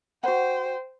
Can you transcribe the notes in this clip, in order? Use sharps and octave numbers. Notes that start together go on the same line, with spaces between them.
F#4 C5 F#5 G5